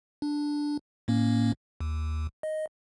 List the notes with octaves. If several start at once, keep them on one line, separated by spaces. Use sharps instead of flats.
D4
A2 A#3 C#4
D#2
D#5